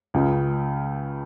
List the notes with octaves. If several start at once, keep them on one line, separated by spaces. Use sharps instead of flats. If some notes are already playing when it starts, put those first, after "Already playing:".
C#2 C#3 G#3